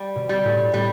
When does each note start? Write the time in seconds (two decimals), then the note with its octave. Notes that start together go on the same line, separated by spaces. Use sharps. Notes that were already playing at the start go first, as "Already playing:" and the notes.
Already playing: G3
0.15 B2
0.29 G3
0.44 A2
0.73 A2 G3